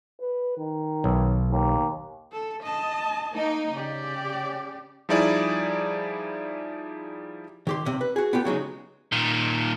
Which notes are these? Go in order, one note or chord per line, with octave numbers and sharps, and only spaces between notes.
B4
D#3
B1
D#2
A4
D#5 A5
A#3 D#4
C#3 G4 D5
F3 G3 D#4 E4 G#4 D5
D#3 G4 C6
B1 C3
B4
F#4 G#4
B3 F4 G4 A4
C#3 F#3 G#3 D#4
A#2 D#3